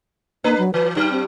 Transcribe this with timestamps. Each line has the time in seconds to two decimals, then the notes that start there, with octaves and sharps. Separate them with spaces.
0.44 A#3 D4 B4
0.58 F#3
0.74 E3 B4
0.95 G2 F#3 D#4
1.11 C4